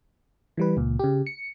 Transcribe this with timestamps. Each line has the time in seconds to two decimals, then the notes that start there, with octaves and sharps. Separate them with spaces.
0.57 E3 G3 B4
0.77 C#2 A#2
0.99 C#3 G4
1.27 C#7